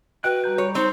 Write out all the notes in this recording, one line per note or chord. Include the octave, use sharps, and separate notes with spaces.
F#4 B4 D#5 G5 F#6
G3 A#5 G6
C#5
C4 D#4 C5